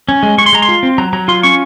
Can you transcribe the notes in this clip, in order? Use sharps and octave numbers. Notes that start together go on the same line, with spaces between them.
C#4
G#3
G#3 C#6
C6
G#3 A#5
C6
F4
C4
F#3 A#5
F#3 A#5
F4 C6
C#4 C#6